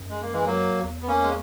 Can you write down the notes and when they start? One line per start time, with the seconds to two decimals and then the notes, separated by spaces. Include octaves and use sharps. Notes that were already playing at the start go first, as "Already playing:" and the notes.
Already playing: F#2
0.10 G#3
0.22 A#3
0.33 E3 G#3
0.46 F#3 A#3
0.83 E2
1.02 B3
1.08 A#3 C#4
1.22 G#3